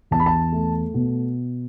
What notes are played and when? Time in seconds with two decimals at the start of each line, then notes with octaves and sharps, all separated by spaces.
0.11 E2 A5
0.19 B5
0.26 A5
0.52 A3
0.94 B2